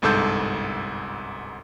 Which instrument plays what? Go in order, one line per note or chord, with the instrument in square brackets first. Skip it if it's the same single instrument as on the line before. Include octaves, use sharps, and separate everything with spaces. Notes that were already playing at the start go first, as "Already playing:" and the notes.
[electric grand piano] G1 C2 G#2 A4 E6 G6